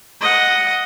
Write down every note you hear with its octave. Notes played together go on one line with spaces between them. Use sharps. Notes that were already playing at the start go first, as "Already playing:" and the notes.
D#5 F#5